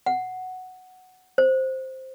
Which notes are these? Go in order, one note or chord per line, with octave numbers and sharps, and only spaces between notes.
F#5
C5